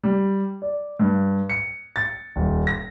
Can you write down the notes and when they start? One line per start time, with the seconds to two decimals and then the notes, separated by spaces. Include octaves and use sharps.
0.04 G3
0.62 D5
0.99 G2
1.50 C#7
1.96 A6
2.36 D#1
2.67 A#6